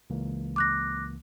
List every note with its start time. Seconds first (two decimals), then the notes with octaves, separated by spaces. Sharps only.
0.10 C#2 E3 A#3
0.56 D6 F#6 A#6